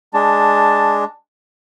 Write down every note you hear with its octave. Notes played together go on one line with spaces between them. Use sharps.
G#3 D4 A5